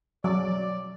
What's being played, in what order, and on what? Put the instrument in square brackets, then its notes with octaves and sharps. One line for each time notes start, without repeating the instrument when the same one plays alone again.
[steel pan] F#3 [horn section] D5